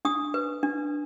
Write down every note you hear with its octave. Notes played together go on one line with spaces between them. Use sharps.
D4 D#6
B4
D4